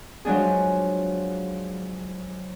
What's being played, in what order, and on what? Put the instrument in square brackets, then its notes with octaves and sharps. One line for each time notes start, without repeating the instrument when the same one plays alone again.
[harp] F3 F#3 G#3 D4 G#4